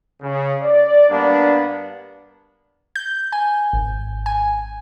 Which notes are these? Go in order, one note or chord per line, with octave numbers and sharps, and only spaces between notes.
C#3
D5
G2 A#3 B3 D4
G6
G#5
G#1
G#5